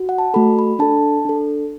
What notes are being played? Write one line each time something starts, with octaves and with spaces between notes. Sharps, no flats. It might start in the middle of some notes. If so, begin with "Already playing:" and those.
Already playing: F#4
F#5
A5
A3 F#4 A4 B5
B5
D4 A4 A5
D4 A4